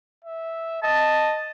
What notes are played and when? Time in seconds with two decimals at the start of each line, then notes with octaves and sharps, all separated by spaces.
0.24 E5
0.83 D#5 A5